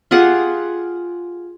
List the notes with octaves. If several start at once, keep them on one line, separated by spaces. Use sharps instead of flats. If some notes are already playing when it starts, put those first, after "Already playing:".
F4 G4 G#4 F#5